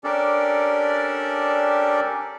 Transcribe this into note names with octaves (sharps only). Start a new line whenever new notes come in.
C#4 D4 G4 A4 A#4 D5